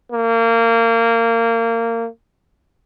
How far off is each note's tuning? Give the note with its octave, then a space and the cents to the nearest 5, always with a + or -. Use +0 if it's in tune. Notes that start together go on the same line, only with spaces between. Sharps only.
A#3 -25